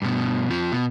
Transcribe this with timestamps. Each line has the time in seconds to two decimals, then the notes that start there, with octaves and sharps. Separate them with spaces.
0.02 G2 B2
0.49 F2 F3
0.72 B2